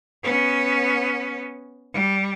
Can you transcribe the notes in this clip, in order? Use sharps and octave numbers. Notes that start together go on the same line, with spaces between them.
B3 C#4
G3